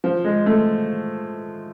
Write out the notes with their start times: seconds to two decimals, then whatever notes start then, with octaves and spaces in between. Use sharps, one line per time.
0.04 F3
0.24 G#3
0.46 A3